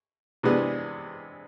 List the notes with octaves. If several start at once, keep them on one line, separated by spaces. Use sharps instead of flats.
C3 E3 G#3 B3 D4